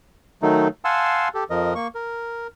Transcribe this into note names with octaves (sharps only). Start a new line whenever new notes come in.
D#3 F#3 A3 D#4
F5 F#5 G#5 A5 C6 E6
G4 A4
F2 F3 A#4 D#5
A#3 C#6
A#4